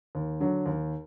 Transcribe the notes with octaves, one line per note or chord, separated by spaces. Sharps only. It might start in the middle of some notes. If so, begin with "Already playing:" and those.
D#2
D3 F#3
D#2